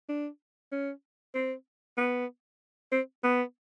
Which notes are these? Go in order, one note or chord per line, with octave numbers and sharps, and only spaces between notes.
D4
C#4
C4
B3
C4
B3